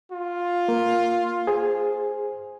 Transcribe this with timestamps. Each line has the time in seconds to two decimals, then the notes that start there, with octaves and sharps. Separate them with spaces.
0.12 F4
0.68 A#3
1.47 G#4 C5 G#5